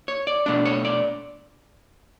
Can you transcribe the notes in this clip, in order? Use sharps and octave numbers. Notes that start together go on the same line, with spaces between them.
C#5
D5
B2 A3 D4 D5
C#5
D5